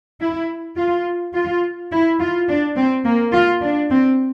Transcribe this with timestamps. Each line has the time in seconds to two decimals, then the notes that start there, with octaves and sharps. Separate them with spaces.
0.20 E4
0.77 F4
1.34 F4
1.91 E4
2.20 F4
2.48 D4
2.77 C4
3.05 A#3
3.33 F4
3.62 D4
3.90 C4